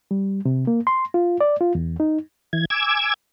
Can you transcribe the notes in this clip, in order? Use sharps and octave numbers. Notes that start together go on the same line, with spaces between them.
G3
C3
A#3
C6
F4
D5
F4
E2
D#4
E3 G#6
G#5 D6 E6 G#6